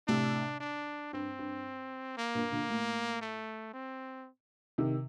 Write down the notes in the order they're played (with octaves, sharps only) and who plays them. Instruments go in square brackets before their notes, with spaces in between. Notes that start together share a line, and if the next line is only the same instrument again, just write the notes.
[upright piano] A2 C3 [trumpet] D4
[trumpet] D4
[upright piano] G2 [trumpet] C4
[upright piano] G2
[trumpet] A#3
[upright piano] G2 A#2
A#2 D3
A2
[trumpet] A3
C4
[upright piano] C3 D#3